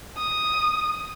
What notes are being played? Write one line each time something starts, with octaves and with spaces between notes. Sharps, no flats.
D#6